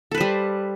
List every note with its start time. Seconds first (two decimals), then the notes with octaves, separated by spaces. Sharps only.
0.11 A4
0.14 B4
0.17 C5
0.21 G3